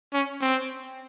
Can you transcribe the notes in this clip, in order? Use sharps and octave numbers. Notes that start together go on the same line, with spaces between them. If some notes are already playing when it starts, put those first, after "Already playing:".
C#4
C4